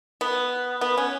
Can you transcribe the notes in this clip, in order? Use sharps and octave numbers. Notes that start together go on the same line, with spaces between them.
B3
B3
C#4